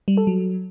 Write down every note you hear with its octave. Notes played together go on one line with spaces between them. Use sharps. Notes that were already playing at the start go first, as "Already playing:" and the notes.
G3
A4
F#3